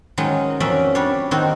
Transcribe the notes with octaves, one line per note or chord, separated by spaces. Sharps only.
D#3 F#3 G#3 C#4
F2 F#3 C#4 D5 E5
G3 D4 C#5
D#3 A#3 C4 F#4